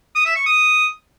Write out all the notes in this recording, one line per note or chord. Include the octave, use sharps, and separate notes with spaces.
D#6
E5
C#6
D#6